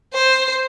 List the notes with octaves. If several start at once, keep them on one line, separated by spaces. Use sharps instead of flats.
C5